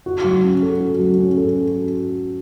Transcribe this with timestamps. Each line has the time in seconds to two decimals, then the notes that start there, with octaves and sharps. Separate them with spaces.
0.06 F#4
0.24 F#3
0.43 C#4
0.62 A4
0.80 F#4
0.99 F#3
1.18 C#4
1.37 A4